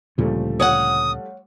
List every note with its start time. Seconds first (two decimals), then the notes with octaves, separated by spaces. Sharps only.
0.18 D2 A#2 C#3 F3 G3 A3
0.60 C#5 F5 F#5 D#6